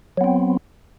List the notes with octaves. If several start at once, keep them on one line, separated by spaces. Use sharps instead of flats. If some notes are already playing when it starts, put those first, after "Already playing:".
F#3 B3 C4